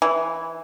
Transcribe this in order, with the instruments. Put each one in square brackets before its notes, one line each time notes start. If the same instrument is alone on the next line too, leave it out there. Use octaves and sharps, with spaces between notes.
[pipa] E3